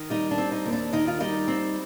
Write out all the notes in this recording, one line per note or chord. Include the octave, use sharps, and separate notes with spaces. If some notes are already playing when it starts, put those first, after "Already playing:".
Already playing: D#3
G3 D#4
D4
C4
D#4
D#2
D4
D#3 D#4
F4
G3 D#4
C4